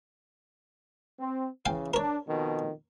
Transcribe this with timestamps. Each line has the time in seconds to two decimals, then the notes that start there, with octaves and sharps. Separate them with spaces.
1.20 C4
1.66 C#3 E3 F5 G5 G#5
1.94 D4 A#4 C#5
2.28 F2 B2 D#3